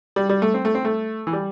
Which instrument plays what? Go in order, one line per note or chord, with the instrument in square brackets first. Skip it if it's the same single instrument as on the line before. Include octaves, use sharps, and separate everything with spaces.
[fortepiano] G3
G3
A3
C4
A3
C4
A3
E3
G3